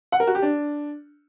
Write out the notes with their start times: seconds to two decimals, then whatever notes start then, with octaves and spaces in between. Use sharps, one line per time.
0.12 F#5
0.20 A#4
0.27 F#4
0.35 G4
0.42 D4